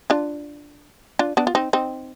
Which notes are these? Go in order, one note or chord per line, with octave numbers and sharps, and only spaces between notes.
D4 F4
D4 F4
B3 D4
F4
C4 D#4
C4 D#4